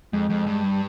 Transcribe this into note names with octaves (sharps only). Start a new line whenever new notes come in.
F2 G#3
F2
G2
G3